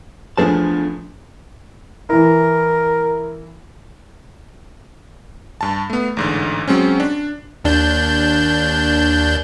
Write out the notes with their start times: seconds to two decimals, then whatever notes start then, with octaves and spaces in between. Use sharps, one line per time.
0.38 E2 F3 A3 D4 G#4 A5
2.09 E3 E4 A#4
5.61 G2 A5
5.90 A3 B3
6.17 A1 G#2 D3
6.68 F#3 G#3 C4 C#4
7.00 D4
7.64 D#2 D4 G6